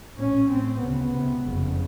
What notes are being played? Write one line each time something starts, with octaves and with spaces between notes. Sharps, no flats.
A#1 A2 C#4
A1 A2 C4
D2 C#3 B3
C#2 C3
F#1 F2 C#3